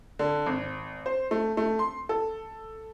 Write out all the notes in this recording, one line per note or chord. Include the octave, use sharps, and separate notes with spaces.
D3
G#1
C5
A3
A3
C6
A4